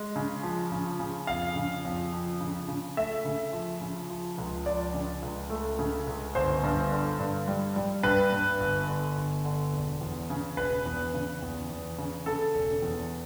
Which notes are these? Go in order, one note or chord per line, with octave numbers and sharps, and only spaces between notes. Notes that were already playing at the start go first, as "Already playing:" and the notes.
Already playing: G#3
C#3
F3
C#3
C#3
F2 F5
C#3
F2
F3
C#3
C#3
A3 E5
C#3
F3
C#3
F3
C#2
F3 D5
C#3
C#2
A3
C#3
C#2
G1 C5
G2
D3
G2
G3
G3
G2 B4
G2
G1
D3
G1
D3
E1
E2
C#3
E1 B4
E2
C#3
E2
E2
C#3
C#3 A4
E1
E2